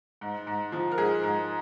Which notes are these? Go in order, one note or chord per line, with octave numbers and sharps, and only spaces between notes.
G#2
G#2
F3
A#4
G#2 G#4
G#2